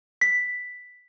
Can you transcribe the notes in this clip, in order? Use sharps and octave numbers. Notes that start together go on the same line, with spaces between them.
B6